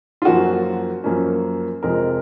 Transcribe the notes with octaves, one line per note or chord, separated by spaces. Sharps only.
F4
F#2 F3 A#3 C#4 F#4
F#2 F3 A#3 C#4
F2 C3 F3 G#3 A#4